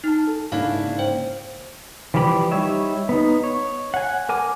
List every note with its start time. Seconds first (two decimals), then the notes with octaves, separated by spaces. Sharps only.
0.04 D#4 A5 F6
0.27 A4
0.52 G#2 C#3 A#3 C#4 D4 E4 F5
0.99 C5 G5
2.14 E3 F3 G3 G4 B5
2.52 G3 D#4 G4 C#5 E5
3.09 B3 D#4
3.44 C#5
3.94 F#5 G#5
4.29 A#4 G#5 D6